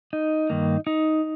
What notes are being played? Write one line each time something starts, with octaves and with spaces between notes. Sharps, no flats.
D#4
G2 D#3 A#3
D#4